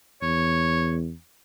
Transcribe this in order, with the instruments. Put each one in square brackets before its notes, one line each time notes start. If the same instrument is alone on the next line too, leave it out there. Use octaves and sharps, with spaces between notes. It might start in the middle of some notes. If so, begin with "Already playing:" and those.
[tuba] E2 [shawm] C#5